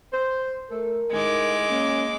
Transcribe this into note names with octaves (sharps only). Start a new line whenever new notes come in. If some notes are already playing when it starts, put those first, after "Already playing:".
C5
A3 A4 A#4
A2 D#3 G#3 D6
A#3 C#4